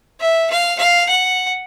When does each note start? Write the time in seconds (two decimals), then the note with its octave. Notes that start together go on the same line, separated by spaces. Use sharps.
0.21 E5
0.51 F5
0.79 F5
1.09 F#5